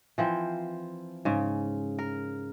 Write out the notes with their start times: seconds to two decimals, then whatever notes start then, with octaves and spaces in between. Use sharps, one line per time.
0.18 E3 F3 C4
1.25 G#2 C#3
1.99 A#4